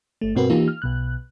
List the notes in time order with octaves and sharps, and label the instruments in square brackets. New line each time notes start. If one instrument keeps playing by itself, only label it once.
[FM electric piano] G1 A3
G2 B2 C4 F#4 A#4 B4
E3 A#3 D#4 F4 G4
F6
B1 B2 F#6